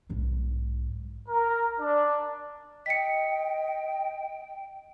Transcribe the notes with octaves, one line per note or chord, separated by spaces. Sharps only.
B1 G#2
A#4
D4
D#5 G5 B6 C#7